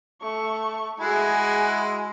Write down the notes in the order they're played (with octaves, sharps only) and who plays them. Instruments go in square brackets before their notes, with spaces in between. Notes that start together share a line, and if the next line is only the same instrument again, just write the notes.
[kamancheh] A3 C#6
[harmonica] G#3 E4 F#4 [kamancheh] G#4 G#5